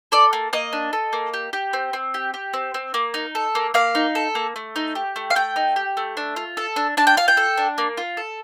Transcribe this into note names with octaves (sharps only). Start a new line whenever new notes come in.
A4 D5
A#3
A#3 D#5
D4
A4
A#3
G4
G4
C4
C4
G4
G4
C4
C4
A#3
D#4
A4
A#3
A#3 F5
D#4
A4
A#3
A3
D#4
G4
A3
F5
A3 G5
D#4
G4
A3
D4
F4
A4
D4
D4 A5
G5
F4 F5
G5
A4
D4
A#3
F4
A4